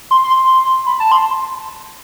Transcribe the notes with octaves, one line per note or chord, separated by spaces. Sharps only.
C6
C6
C6
B5
A5
C6